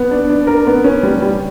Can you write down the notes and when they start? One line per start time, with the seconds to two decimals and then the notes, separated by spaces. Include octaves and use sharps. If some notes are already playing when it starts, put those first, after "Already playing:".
Already playing: B3
0.11 D4
0.29 D4
0.47 A#4
0.67 B3
0.84 C#4
1.03 G3
1.22 G3